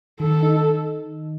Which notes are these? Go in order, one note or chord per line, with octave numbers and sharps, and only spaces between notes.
D#3 A4
D#4